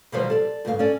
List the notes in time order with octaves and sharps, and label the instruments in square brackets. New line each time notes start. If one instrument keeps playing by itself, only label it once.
[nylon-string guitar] B2 D#3 F3 G3 B4 C5
A4 D5
G2 C#3 A#3 G4 F5
C#4 A4 D5